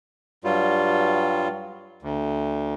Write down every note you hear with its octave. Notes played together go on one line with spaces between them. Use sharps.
G2 F#3 G3 F4
D2